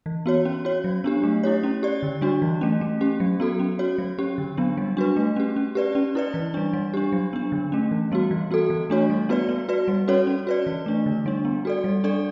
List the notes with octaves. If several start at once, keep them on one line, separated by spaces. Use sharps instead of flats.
E3
B3 F#4 C#5
C#4
F#4 C#5
F#3
B3 D4 G4
A3
E4 G4 C#5
C#4
G4 D5
D3
G3 D4 F#4
E3
A3 C#4
A3
C#4 G4
F#3
B3 F#4 A4
C#4
F#4 C#5
F#3
C#4 G4
D3
F#3 B3 D4
G3
D4 F#4 B4
A3
C#4 G4
C#4
G4 B4 D5
C#4
E4 B4 D5
E3
G3 D4
G3
D4 G4
F#3
B3 D4
D3
A3 C#4
E3
G3 B3 F#4
E3
B3 F#4 A4
E3
A3 D4 F#4 C#5
G3
B3 F#4 B4 D5
B3
F#4 B4 D5
G3
C#4 F#4 A4 C#5
C#4
F#4 B4 D5
E3
A3 D4
D3
G3 D4
B3
F#4 A4 D5
G3
D4 A4 D5